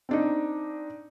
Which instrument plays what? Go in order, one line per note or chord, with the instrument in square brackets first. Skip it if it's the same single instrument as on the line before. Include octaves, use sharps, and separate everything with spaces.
[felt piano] C4 D4 D#4